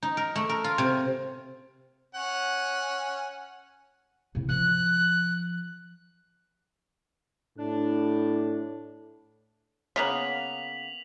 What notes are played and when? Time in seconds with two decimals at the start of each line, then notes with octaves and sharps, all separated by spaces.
0.02 D#4
0.17 A#4
0.35 A3
0.49 A#4
0.64 F4
0.78 C3
2.15 C#4 F#5 G#5
4.35 C3 E4
4.49 F3 F#6
7.58 A2 D4
9.96 C#3 A#3 B3 B6 F7 F#7